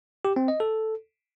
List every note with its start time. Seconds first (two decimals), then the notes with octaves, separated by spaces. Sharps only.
0.25 G4
0.36 C4
0.48 D#5
0.60 A4